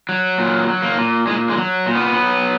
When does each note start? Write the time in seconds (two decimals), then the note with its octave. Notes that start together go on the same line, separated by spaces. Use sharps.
0.09 F#3
0.38 A#2
0.68 F#3
0.82 A#3
0.98 A#2
1.27 A#2 G#3
1.50 G#3
1.57 F#3
1.86 A#2
1.95 B3
2.16 F#3